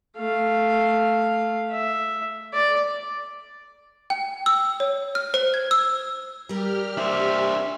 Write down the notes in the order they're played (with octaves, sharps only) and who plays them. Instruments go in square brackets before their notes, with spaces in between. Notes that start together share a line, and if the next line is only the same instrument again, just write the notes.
[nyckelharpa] A3 F5
E5
D5
[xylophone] G5
E6
C#5
F6
C5
G#6
E6
[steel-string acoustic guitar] G3 A#4 [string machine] G4 F6
[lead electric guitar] D4 C5 [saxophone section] E5